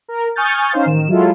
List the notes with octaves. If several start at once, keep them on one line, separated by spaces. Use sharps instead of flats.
A#4
G#5 C#6 D#6 F6 G6 A6
C#4 D#4 C5 F5
A1 D#3 E7
F#3 G#3 E4 F4 A4